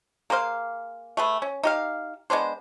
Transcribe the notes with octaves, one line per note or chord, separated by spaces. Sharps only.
A#3 G#4 C5 F5
A3 G#4 B4
C#4
D#4 G4 F5
G#3 B3 D4 C5